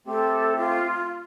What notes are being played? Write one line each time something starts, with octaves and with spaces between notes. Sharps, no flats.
A3 C4 G4 A4
F4